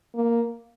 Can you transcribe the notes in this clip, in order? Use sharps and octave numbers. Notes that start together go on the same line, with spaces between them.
A#3